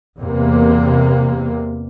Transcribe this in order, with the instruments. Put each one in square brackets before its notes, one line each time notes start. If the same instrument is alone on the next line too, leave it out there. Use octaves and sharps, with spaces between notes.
[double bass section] E2 C3 A#3